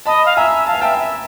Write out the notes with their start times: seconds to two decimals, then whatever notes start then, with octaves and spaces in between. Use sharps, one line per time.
0.06 D#5 A5 B5
0.26 F5
0.37 E5 G#5 A#5
0.67 F5 A5
0.75 G#5
0.81 E5 G5 A5
0.99 E5